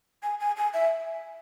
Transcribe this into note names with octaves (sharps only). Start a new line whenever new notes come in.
G#5
G#5
G#5
E5